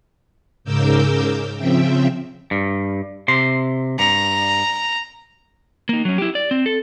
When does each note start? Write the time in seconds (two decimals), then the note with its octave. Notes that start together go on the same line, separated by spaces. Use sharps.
0.64 G#2 C#3 A#4 D6 E6 G6
1.58 C#3 F3 C4 E5 G5
2.51 G2
3.28 C3 C6
3.99 G2 A#5
5.89 A#3 D#4
6.05 F#3 C#4
6.18 E4 G4
6.35 D5
6.51 C4
6.66 A4